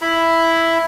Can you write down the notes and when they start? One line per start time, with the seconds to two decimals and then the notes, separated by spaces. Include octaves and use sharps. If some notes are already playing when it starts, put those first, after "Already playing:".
0.01 E4 B5